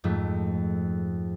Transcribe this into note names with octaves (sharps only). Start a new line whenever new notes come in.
F2 G#2 F3 A3